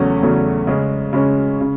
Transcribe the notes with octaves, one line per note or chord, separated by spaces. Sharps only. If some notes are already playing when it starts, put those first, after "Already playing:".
Already playing: E2 C#3 F#3 A3 C#4
E2 C#3 F#3 A3 C#4
C#3 G#3 C#4 G#4
C#3 G#3 C#4 G#4
C#3